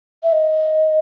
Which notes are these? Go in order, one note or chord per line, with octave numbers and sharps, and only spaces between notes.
E5
D#5